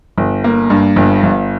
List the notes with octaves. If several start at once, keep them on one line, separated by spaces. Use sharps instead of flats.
G1
A#3
G2
G1
G1